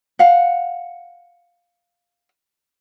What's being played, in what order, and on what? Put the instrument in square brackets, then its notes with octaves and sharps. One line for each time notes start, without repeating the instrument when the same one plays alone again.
[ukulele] F5 F#5